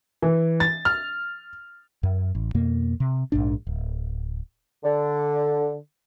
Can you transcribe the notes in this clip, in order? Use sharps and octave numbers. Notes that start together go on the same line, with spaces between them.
E3
A6
F6
F#2
A1
F2 B2 A#3
C3
A#1 G#2 D4
D1
D3